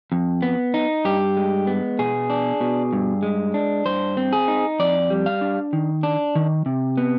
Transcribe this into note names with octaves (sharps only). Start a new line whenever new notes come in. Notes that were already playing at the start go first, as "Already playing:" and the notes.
F2
B3
D#4
G2 G4
G#3
B3
B2 G#4
D4
B2
G2
G#3
D4
G2 C5
C4
G#4
D#4
F2 D5
G3
F5
D4
D#3
D4
D#3
C3
B3